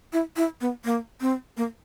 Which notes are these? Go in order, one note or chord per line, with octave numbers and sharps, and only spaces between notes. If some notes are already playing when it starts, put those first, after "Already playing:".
E4
E4
B3
A#3
C4
A#3